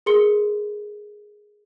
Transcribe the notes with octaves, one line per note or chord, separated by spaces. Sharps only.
G#4 A#4 C6 C#7 G7